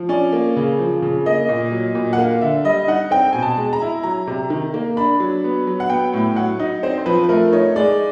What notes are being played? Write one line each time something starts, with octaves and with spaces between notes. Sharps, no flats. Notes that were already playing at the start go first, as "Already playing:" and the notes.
Already playing: F3
C#4 D5
A#3
C#3
F3
C#3
A#3 D#5
A#2
F#3
A#2
F#5
A#3 F5
D3 E5
G3 D#5
D#4 F#5
C4 G5
B2 G#5
A5
G#3
A#5
E4
F#3 A#5
C3
D#3
A#3
D4 B5
F#3
B3
F#3
F#5
B3 G5
A2
F#3 F#5
D#4
C4 C5
C5
F3 B4
B4
A3 A#4
D#4 C#5
G#3 D5